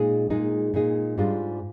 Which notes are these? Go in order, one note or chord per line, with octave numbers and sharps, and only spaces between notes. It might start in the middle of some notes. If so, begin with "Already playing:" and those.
Already playing: A#2 G#3 D#4 G#4
A#2 G#3 D#4 G#4
A#2 G#3 D#4 G#4
G#2 G3 D4 F4 G#4